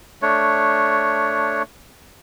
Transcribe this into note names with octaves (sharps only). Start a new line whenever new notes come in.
A3 D4 C#5